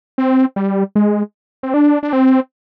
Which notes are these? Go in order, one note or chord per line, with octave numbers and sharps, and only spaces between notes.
C4
G3
G#3
C4
D4
D4
C4